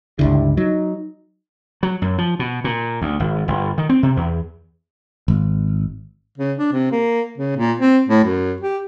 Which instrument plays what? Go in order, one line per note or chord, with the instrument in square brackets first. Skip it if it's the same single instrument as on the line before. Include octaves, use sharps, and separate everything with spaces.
[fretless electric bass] G1 C#2 D3 [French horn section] G3 D4 E4
[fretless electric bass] F#3 [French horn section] D#4
[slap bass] F#3
F#2
F3
B2
A#2
D2
G#1
G1
D#3
C4
C3
E2
[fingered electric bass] G#1
[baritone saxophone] C#3
D4
C3
A#3
C#3
A#2
C4
A2
F#2
G4